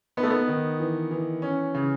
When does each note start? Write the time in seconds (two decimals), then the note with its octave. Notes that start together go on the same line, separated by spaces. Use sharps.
0.17 B3 D#4
0.23 A3
0.30 B3
0.48 D#3
0.80 E3
1.11 E3
1.42 C#4
1.74 C#3